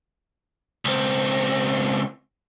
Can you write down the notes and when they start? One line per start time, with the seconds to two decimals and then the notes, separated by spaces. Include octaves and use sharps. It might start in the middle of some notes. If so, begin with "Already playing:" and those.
0.85 C#2 C4